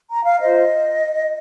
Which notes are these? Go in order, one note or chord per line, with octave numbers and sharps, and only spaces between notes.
A#5
F5
F4 C5 D#5